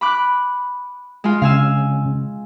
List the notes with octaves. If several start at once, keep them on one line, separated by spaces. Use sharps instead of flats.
B5 D6 F#6
G#3 F4
C#3 F5 G#5 E6